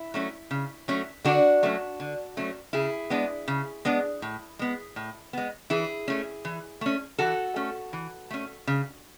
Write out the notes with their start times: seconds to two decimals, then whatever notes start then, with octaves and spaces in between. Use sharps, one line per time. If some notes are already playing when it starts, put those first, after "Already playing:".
Already playing: E4
0.14 F#3 A3 C#4
0.51 C#3
0.88 F#3 A3 C#4
1.25 D3 D4 F#4
1.63 F#3 A3 C#4
2.00 D3
2.37 F#3 A3 C#4
2.73 C#3 E4 G#4
3.10 G#3 B3 D4
3.48 C#3
3.85 G#3 B3 D4
4.22 A2
4.59 G#3 B3
4.96 A2
5.33 G#3 B3
5.70 E3 E4 G#4
6.08 A3 C#4
6.45 E3
6.81 A3 C#4
7.18 E3 F#4 A4
7.56 A3 C#4
7.93 E3
8.31 A3 C#4
8.67 C#3